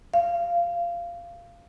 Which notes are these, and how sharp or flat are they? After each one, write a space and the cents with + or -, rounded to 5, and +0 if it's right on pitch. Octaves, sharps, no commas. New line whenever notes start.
F5 -15